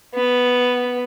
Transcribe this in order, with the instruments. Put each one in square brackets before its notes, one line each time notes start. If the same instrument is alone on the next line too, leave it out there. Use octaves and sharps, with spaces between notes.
[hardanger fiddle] B3